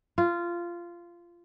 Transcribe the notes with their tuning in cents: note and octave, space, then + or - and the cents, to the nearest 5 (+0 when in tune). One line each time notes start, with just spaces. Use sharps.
F4 -15